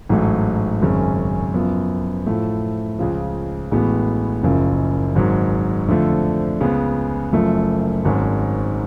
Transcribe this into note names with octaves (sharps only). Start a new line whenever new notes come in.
A1 G#2 F#3 A3
G#1 F#2 C#3 G#3 C#4
F#2 F3 B3
A2 F3 A3
C#2 C#3 F3
A1 A2 G#3 B3 F#4
F#1 F#2 C#3 F3
G#1 G#2 F#3
F2 D3 F3 A3
C#2 C#3 G#3 B3
F#1 F#2 F3 A3
G#1 G#2 F#3 C#4